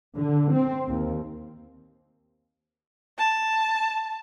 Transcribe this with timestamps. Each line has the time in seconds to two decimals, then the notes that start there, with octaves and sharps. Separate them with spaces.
0.16 D3
0.52 C4
0.86 D#2
3.18 A5